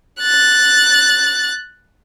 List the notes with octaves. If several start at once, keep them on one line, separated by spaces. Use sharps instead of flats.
F#6 A6